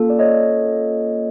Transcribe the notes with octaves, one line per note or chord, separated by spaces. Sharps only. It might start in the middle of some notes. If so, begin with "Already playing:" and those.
Already playing: A#3 C#4 F4 A4
D5
C#5 D#5